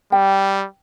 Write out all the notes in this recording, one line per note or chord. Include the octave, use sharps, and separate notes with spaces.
G3 G5